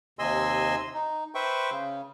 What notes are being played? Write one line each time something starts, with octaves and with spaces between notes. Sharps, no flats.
D#2 C3 D#5 G#5 C6 E6
D#4
B4 C5 E5 G5 C#6
C#3